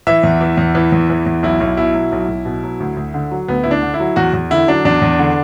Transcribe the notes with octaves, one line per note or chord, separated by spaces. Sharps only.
E3 E5
E2
E3
E2
E3
E2
E3
E2
B1 E4
B1
B2 E4
F#3
B1
B1
B2
F#3
D2
D2
D3
F#3
D2 B3
D2 E4
D4
D3
E4
F#3
E2 F#4
E2
D3 E4
F#3 D4
E2 D4
E2
D3